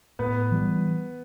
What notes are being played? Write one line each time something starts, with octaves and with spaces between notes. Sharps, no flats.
A2 B3 B4
E3 G3